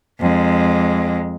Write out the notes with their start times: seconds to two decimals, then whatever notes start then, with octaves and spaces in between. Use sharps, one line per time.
0.21 F2 G#3